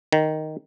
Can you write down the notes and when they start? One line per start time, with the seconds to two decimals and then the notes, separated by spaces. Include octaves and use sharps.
0.12 D#3